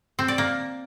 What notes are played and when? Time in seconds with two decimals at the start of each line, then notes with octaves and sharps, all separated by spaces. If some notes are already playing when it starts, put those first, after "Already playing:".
0.19 C4
0.28 D5
0.38 A#3